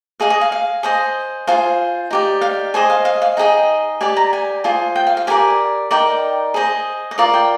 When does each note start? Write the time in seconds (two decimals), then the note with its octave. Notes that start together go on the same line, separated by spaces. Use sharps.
0.20 G#4 D#5 F5
0.30 D#5
0.41 F5
0.52 F5
0.83 G#4 C5 D#5
1.47 F4 G#4 C5 F5
2.11 D#4 G4 D5
2.41 F5
2.74 G#4 C5 D#5
2.90 F5
3.05 F5
3.22 F5
3.37 D#4 G#4 D#5 G5
4.01 G4 D5 G#5
4.16 A#5
4.33 G#5
4.64 F4 G#4 C5
4.96 G5
5.07 F5
5.17 F5
5.27 G4 A#4 D5 G#5
5.91 D#4 A#4 D5 G5
6.54 G#4 C5 D#5
7.11 D#5
7.18 F4 A#4 D5 F5
7.34 G5